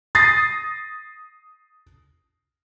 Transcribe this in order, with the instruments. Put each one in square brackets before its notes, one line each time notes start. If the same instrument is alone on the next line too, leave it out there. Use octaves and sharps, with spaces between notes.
[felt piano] D#6 A6 A#6 C7